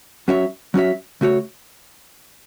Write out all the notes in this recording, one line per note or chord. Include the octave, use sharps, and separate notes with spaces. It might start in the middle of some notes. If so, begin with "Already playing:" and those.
F#3 C#4 F#4 C#5 E5
F#3 C#4 F#4 C#5 E5
C#3 A3 F#4 C#5